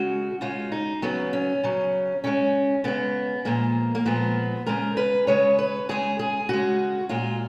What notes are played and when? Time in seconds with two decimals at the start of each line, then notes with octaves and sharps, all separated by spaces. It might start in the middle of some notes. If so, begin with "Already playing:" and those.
Already playing: C#3 G#3 F#4
0.41 C#3 G#3 F4
0.72 D#4
1.02 C#3 F#3 B3
1.33 C#4
1.64 C#3 F#3
2.24 C#3 G#3 C#4
2.84 C#3 G#3 B3
3.45 A#2 F3 G#3 A#3
3.95 A#3
4.06 A#2 F3 G#3 B3
4.66 C#3 G#3 A#4
4.97 B4
5.27 C#3 G#3 C#5
5.59 B4
5.89 C#3 G#3 G#4
6.19 G#4
6.49 C#3 G#3 F#4
7.09 A#2 G#3 F4